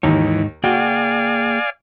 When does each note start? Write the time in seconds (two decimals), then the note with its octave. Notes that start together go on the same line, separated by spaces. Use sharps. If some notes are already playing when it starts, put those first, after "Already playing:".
0.03 D#2 G#2 E3 D#4 C#5
0.64 A#3 F#4 G#4 D5 F5 G5 G#5